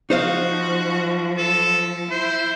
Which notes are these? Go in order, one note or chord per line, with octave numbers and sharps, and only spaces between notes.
F3 D#4 F#4 C5 F5
A4
E4 C5